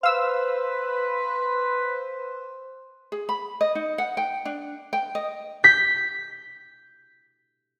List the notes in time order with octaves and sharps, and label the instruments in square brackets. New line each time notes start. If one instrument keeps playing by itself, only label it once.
[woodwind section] B4 [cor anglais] C5 [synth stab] F5 E6
[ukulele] G#4
B5
D#5
D#4
F#5
G5
D4
G5
D#5
[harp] G6 B6